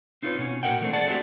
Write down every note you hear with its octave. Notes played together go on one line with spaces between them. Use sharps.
C4 D#4 F4 F#4 B4 C#5
B2 C#4
A#2 F#4 A#4 E5 F#5 G5
E3 A3 C4 D4
G#4 D5 F#5 A5
A3 C4 D4 D#4 F#4 G4